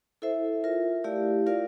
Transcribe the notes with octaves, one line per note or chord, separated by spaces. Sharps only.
E4 A4 C5 E5
F4 A#4 E5
A3 E4 G4 D5 F5
F4 A#4 D5 F5